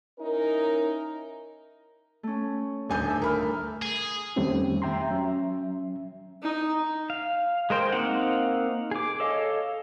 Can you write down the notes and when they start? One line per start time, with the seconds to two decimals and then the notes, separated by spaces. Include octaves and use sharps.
0.19 C#4 D#4 E4 A#4
2.23 A3 C#4
2.89 D#1 D2 A2 D#4 G#5 G6
3.08 E5
3.22 A#4 B5 F6
3.82 G#4
4.36 F2 D#3 G3 A3 C4 C#4
4.82 E5 G5 A#5 C6
5.10 F#3 C#4 E5
6.42 D#4
7.10 F5
7.70 G#3 A#4 C5 G5
7.92 A#3 C4 D#4 F5 F#5
8.91 G#4 D6
9.20 A4 C#5 D#5 F5